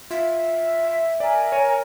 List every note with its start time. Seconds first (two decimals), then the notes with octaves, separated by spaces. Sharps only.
0.11 F4 E5
1.20 A#4 D5 G#5
1.52 C#5 D#7